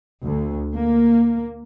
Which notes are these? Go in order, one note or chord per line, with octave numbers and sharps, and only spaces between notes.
D2
A#3